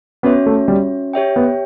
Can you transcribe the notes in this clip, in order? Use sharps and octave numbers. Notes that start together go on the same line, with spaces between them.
B3 C#4 F#4 C#5 E5
A3
G3
G4 C#5 E5 G5
B3